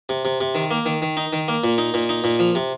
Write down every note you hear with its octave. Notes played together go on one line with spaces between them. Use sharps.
C3
C3
C3
D#3
A#3
D#3
D#3
D#4
D#3
A#3
A#2
D#4
A#2
D#4
A#2
F3
C3